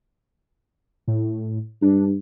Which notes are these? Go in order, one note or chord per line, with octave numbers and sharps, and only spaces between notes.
A2
G2 D4